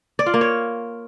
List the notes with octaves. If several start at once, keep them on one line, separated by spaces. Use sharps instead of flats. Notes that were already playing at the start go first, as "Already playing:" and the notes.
D5
F4
A#3
C#5